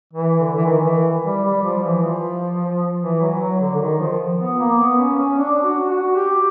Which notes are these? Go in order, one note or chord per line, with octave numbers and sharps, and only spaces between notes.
E3
D3
E3
D#3
E3
G3
G3
F3
E3
F3
E3
F#3
F#3
D3
D3
D#3
F3
B3
A#3
B3
C#4
C#4
D4
F#4
F#4
G4